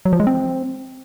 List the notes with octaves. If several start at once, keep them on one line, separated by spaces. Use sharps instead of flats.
F#3
F3
G#3
C4